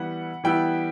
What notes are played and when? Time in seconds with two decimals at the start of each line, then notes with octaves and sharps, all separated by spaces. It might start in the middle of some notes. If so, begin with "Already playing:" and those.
Already playing: E3 G3 B3 E4 F#5
0.44 E3 G3 B3 E4 G5